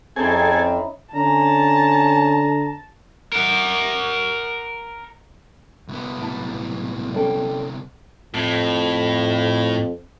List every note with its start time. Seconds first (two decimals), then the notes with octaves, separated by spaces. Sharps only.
0.16 F2 C4 C#4 D#4 E4 G#4 A4 G#5
1.15 D3 C#4 A5 A#5
3.32 A#4 F#5
5.88 C2 B3
6.19 B1 A2 A5
7.14 G3 C#4 A4 D5 G5
8.34 F2 A2